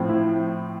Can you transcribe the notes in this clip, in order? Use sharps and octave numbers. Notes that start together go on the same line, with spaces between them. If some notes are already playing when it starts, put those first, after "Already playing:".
Already playing: A2 F3 C4
E4